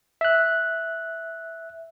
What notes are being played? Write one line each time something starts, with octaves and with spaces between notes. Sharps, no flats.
E5 F#6